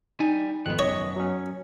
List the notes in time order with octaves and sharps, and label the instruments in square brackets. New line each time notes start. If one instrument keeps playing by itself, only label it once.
[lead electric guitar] G3 G#5 [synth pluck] D#4
[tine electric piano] G#1 F2 F#6 [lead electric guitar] D#3 B3
[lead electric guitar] F#2 B3 [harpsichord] C#5 [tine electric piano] D#5
[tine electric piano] F#3 C#4